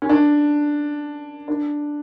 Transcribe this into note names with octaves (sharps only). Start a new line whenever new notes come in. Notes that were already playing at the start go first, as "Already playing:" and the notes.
C#4
D4
D4